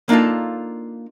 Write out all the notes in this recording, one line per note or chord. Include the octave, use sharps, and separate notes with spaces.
A#3 D4 D#4 F4 A4